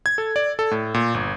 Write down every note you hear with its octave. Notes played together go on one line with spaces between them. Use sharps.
G#6
A4
D5
A4
A2
A#2
G1